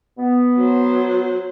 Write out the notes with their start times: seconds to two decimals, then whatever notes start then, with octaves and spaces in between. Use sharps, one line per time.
0.18 B3
0.56 F#3 C5